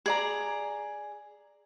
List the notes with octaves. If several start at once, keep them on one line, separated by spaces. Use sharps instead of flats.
G#4 D5 A#5